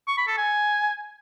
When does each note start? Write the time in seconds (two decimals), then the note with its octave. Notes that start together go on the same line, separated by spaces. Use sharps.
0.08 C#6
0.18 B5
0.28 A4
0.38 G#5